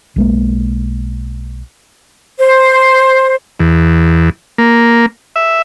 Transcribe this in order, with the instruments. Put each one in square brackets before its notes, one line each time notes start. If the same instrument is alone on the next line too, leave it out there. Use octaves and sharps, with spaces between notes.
[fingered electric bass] B1 G#3 A#3
[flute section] C5
[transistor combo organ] E2
A#3
E5